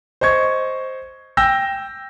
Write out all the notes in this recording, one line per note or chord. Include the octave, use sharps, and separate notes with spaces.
C5 D#5 C#6 G#6
G5 E6 G6 A#6